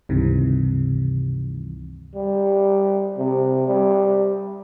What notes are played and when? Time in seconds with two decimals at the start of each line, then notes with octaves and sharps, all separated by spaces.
0.09 C#2 G2 C3 D#3 E3
2.15 G3
3.17 C3
3.67 G3